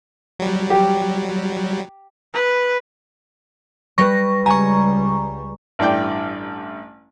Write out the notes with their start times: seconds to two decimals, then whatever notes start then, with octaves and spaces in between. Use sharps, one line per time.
0.39 F#3 G3
0.70 G4
2.34 B4
3.98 G3 B4 C#6 A#6
4.46 C#2 G3 G#5 A#5 C#6
5.79 A1 G2 E4 D5 G5